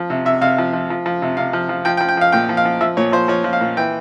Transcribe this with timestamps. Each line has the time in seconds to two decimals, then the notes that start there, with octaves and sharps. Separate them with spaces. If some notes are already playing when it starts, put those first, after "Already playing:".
Already playing: F3
0.10 C3
0.25 C3 E5
0.41 C3 F5
0.58 F3
0.73 F3
0.90 F3
1.06 F3
1.22 C3
1.37 C3 F5
1.53 F3
1.69 F3
1.85 F3 G5
1.97 G5
2.01 F3
2.09 G5
2.17 F3 F5
2.32 A#2 G5
2.49 F3
2.57 F5
2.65 F3
2.81 F3 E5
2.97 A#2 C#5
3.12 F3 C5
3.28 F3 C#5
3.44 F3
3.53 F5
3.61 A#2
3.77 E3 G5